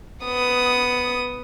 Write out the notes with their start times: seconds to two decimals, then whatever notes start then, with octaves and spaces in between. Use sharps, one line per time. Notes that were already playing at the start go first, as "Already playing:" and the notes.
0.24 B3 D#6